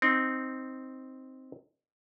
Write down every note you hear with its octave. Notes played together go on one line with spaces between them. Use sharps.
C4 D#4